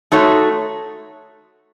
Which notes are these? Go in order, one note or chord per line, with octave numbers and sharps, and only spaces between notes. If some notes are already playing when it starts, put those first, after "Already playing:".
A3 D#4 F#4 C#5